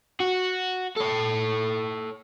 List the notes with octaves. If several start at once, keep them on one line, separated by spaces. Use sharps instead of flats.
F#4
A4 C#5